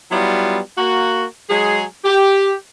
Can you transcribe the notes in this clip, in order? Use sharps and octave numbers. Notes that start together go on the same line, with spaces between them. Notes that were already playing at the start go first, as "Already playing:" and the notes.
F#3 G3 B3 E4 F4
A#3 F#4
F#3 G#3 G#4
G4